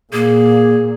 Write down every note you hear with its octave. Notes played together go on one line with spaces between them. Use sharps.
A#2 A#3 G#4